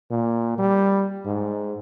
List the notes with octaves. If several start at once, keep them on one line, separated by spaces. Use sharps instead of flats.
A#2
G3
G#2